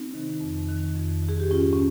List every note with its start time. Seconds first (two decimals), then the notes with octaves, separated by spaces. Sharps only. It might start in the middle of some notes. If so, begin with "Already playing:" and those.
Already playing: C4 D#4
0.13 C3 D#3
0.40 F2
0.69 D#3
0.96 F2
1.23 D#3
1.29 G#4
1.40 G4
1.51 G#2 C#4 F4
1.73 C#4